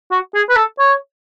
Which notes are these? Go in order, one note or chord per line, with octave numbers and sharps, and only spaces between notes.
F#4
G#4
B4
A4
C#5